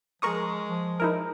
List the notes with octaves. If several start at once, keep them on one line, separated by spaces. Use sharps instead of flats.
F3 G#3 A#4 C#6 D#6
F3
D#4 E4 A#4